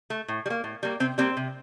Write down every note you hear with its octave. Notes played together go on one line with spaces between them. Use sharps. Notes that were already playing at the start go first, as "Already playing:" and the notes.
A3
A2
G3
A#3
A2
G3 A#3
C3 C4
G3 A#3 C4
C3